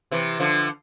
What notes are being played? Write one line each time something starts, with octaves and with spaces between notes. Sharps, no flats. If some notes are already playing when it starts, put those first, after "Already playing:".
C3 E3
D3 F3